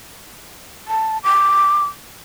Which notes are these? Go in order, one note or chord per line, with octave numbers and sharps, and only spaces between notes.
A5
D6